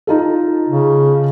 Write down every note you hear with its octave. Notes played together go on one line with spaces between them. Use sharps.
D#4 F4 A4
C#3